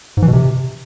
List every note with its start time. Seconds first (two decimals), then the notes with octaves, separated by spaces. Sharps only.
0.17 G#2
0.22 E3
0.28 B2
0.33 C3